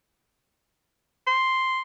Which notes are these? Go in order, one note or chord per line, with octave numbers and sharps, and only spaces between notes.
C6